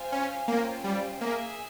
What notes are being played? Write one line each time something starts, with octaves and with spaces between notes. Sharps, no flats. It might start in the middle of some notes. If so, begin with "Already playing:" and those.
Already playing: F4 C5 F5 G#5
C#4
A#3 C#4 F4 C5 G5
G3
A#3 G#4 E5 G#5